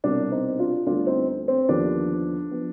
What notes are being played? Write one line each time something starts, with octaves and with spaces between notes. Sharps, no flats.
C2 B2 G3 B3 D4
C4 D#4
D4 F4
D2 D3 G3 B3 D4 F4
C4 D#4
C4
D#2 D3 F3 B3 D4
F3 B3